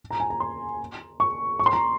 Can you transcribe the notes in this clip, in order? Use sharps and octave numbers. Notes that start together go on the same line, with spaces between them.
A#5
G#5
A#5
C6
C#6
C#6
C6
A#5